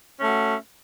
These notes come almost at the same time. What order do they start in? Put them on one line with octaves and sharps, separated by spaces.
C#4 A3 F#4